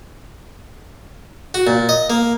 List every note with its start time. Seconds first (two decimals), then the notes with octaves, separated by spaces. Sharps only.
1.54 F#4
1.67 A#2
1.89 D#5
2.10 A#3